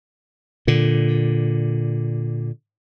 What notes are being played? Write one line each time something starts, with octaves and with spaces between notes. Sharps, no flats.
A#2 D3